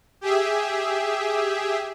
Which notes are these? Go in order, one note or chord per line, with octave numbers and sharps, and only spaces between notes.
G4 G#4 E5